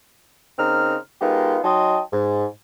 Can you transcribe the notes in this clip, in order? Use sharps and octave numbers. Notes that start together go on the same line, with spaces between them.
C#3 C4 D#4 A#4 F6
G#3 B3 D#4 F4 G4 A#4
F#3 D#4 D#5 G5 A5 C6
G#2